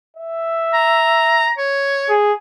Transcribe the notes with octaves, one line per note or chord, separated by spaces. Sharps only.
E5
A#5
C#5
G#4